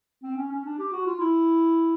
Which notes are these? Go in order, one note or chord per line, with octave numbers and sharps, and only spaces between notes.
C4
C#4
C#4
D4
G4
F#4
F4
E4